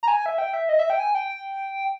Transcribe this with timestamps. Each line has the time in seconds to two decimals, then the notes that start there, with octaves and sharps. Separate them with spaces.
0.03 A#5
0.08 G#5
0.26 E5
0.38 G5
0.54 E5
0.69 D#5
0.79 E5
0.90 G5
1.00 G#5
1.15 G5